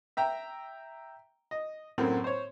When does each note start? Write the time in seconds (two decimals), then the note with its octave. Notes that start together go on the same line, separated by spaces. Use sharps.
0.17 E5 G5 A#5
1.51 D#5
1.98 F#2 A2 F#3 A#3 C4
2.24 C5 C#5